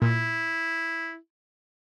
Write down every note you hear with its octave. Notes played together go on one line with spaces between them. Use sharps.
A#2 E4